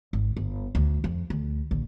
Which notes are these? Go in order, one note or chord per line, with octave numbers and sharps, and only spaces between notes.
G#1
G1
D2
F2
D2
A#1 D3